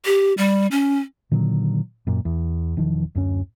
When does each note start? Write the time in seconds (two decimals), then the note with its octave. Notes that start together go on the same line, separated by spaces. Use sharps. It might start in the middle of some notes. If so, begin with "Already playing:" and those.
0.05 G4
0.38 G3
0.71 C#4
1.31 A#2 D3 D#3 F#3
2.07 F#2 A#2
2.25 E2
2.77 E1 D#3 F3
3.15 D1 F#2 C#4